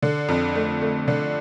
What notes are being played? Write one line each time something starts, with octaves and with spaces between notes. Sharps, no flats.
D3
F2
A3
A3
D3